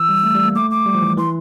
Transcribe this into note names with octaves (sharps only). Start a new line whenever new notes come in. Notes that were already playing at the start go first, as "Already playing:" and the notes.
Already playing: E3 E6
G3
A3
G3
A#3
A3 D6
D6
G3
F3
E3
E3 C6